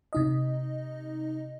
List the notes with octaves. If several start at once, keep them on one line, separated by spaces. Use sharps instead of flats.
C3 D#4 D#5